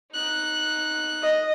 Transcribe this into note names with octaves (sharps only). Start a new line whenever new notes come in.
D#4 F#6
D#5